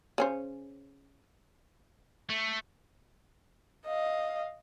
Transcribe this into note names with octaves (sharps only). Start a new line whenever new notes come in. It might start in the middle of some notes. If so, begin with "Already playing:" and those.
C#3 C#4 C5
A3
D#5 F5